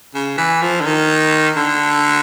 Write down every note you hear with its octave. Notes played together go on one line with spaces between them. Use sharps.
C#3
E3
F3
D3
D#3
D3